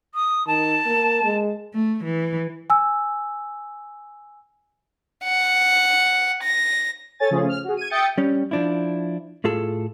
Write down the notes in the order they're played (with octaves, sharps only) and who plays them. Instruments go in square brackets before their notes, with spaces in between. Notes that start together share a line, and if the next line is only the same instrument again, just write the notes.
[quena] D#6
[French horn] D#3 [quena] A5
[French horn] A#3
G#3
[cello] A3
E3
[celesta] G#5 E6
[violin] F#5
A#6
[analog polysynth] A4 C#5 G#5 A6
C#3 F3 A3 C#4 G#4
F6
F#4 G#4
G#6 D#7
E5 G5 D#6 G6 A6 C#7
[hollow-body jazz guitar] G3 C#4
F3 D4 E4
A2 F4 G#4 A4